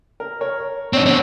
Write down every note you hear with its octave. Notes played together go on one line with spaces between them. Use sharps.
A#4
A#4 C#5
C4 D4 D#4 C#5
D3 B3 C4 C#5